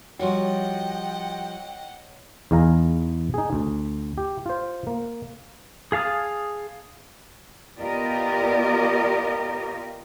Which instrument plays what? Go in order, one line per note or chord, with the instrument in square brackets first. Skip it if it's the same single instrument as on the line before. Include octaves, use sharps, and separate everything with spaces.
[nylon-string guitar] F3 G3 F#4 [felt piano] C#5 [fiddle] D#5 F#5 [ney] G5
[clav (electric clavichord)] E2 D#4 G#4 F5 A#5
D#4 G#4
D2
G4
F4 C5
A#3
[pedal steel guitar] G#4 F5 A5 D#6 F6
[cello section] B3 F4 G4 A#4 D5 D#5